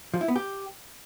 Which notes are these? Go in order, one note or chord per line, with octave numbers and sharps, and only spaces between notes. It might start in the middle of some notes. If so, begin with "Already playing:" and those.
F3
E4
B3
G4